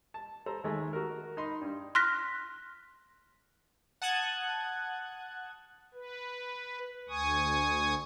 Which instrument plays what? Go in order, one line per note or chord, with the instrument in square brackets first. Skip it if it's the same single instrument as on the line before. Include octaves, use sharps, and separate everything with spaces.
[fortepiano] A5
A4 C5 A#5
D#2 G#3 A3
F#4 A#4
D#4 D#5 B5 C6
G2
[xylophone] C6 F6 F#6 A#6 B6
[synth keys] F#5 A5 D#6 F#6 G#6
[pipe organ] B4
D2 G#5 C#6 D#6